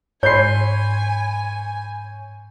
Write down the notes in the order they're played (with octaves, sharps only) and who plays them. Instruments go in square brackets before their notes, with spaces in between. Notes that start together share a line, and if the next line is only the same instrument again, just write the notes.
[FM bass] G#2 [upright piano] C#5 B5 C6 [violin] G#5 [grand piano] G6 C7